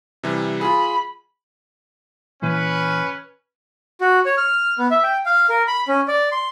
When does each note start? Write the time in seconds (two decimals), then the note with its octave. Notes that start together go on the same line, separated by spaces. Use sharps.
0.23 C3 E3 G3
0.61 F4 G#4 B5
2.42 A#2 E3 C#4 B4
4.01 F#4
4.26 C#5
4.37 F6
4.79 B3
4.91 E5
5.04 G5
5.26 F5
5.49 A#4
5.68 B5
5.88 C#4
6.08 D5
6.32 C6